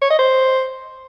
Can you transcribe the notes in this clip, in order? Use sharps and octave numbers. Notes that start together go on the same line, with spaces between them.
C#5
D#5
C5